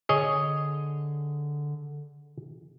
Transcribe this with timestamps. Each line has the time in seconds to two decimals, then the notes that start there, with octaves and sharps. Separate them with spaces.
0.09 D3 G#4 C#5 D#5